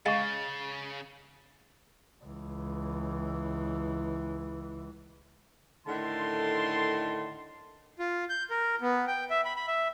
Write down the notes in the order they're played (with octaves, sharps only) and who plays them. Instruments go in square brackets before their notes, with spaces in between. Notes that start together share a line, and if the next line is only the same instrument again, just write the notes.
[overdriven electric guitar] C#3 [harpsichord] G#3 [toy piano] F5 C#6 [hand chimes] A6
[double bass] C#2 E3
[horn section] A2 D3 D#3 A5 C6
[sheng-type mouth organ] F4
G6
A#4
B3
G5
E5
B5
B5
E5